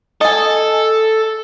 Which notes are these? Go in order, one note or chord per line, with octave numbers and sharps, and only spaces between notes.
A4 D#5 G#5